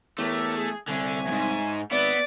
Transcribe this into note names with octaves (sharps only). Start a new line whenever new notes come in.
E2 A3 G4 A#4 C#5
G#4
C2 D3 C#5 E5 G#5
E2 G#2
G#1 B3 B4 D5 E5